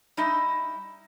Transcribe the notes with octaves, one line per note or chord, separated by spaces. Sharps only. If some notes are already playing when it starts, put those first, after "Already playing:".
G3 D#4 E4 D#5